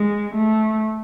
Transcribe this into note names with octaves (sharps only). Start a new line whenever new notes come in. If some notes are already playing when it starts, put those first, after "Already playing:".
Already playing: G#3
A3